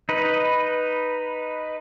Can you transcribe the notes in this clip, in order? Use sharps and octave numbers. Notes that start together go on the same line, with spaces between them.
D#4 B4